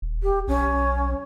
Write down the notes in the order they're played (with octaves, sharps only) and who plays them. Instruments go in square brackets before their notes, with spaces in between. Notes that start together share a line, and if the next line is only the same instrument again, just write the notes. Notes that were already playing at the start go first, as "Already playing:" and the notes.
[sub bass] D#1
[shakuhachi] G4
[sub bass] B1 [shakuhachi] C#4